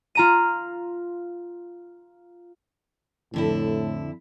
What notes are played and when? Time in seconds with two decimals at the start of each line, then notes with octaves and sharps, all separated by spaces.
0.15 F4 A#5 D#7
3.34 F2 A2 D3 E4